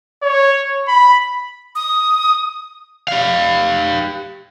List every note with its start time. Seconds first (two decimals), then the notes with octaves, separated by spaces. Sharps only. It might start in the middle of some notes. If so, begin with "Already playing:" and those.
0.23 C#5
0.88 B5
1.75 D#6
3.08 G4 F5